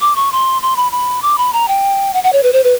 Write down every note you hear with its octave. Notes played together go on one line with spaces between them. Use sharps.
D6
C#6
C6
C6
B5
B5
D6
B5
A#5
G5
F#5
F#5
C#5
B4
C5
B4